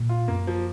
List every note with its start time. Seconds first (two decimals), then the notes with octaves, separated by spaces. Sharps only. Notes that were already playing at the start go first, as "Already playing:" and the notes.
Already playing: A#2
0.09 F4
0.28 F#2 A#3
0.47 F3